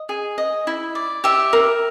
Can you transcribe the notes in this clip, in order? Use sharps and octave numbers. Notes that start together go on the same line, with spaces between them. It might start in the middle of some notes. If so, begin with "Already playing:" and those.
Already playing: D#5
G#4
D#5
E4
D5
G4 E5
A#4